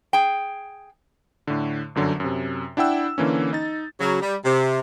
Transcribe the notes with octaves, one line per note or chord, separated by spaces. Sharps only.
G#4 G5
A2 D3
G1 F#2 D3 F#3
F#2 C3
D4 E4 F#5 G5 E6
D3 E3 A#3 C#4
D#4 A6
C#3 F#3
G3
C3